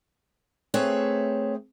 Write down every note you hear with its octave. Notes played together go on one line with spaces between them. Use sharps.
A3 C4 G#4 B4 C#5 E5